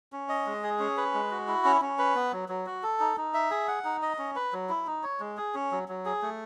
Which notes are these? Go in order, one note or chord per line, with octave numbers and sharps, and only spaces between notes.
C#4
D#5
G#3
G#4
C#4
B4
G#3
F#4
E4
C#4
C#4
B4
B3
F#3
F#3
F#4
A4
D#4
D#4
E5
G#4
F#5
D#4
D#5
C#4
B4
F#3
E4
D#4
C#5
G#3
G#4
C#4
F#3
F#3
G#4
A3